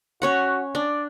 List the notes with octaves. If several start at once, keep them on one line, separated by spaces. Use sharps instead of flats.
C#4 F#4 C#5 F#5
D4 D5